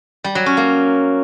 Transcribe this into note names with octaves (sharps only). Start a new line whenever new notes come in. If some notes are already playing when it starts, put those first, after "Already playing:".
G3
F#3
C#4
A#3